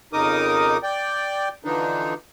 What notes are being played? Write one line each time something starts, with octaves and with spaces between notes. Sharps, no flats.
F2 C#3 D#4 A#4 D6 D#6
D5 G5
D3 E3 F3 D4 D#4